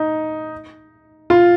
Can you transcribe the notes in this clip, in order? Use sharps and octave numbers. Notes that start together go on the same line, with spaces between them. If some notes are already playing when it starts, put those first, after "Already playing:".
Already playing: D#4
F4